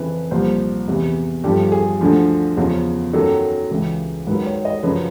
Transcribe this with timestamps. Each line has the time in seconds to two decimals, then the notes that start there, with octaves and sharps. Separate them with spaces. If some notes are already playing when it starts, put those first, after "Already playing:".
Already playing: F2 C#3 E3 B4
0.31 C2 A#2 F3 C5
0.88 E2 C3 E3
1.44 G2 D3 F3 G4
1.72 G#4
2.01 D2 D3 F3
2.57 E2 C#3 F3
3.13 F#2 D#3 F#3 A4
3.71 C#2 C#3 E3
4.27 G#2 D#3 F#3 B4
4.46 C#5
4.65 D#5
4.83 F#2 C#3 F3 B4